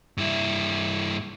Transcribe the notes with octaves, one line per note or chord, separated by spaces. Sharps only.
G2 E4